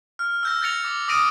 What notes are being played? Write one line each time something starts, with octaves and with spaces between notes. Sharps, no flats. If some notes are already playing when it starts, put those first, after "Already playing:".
F6
E6 G6 A#6
G6 A6 A#6 C#7 F7
D6
D6 D#6 F6 A#6 D7 D#7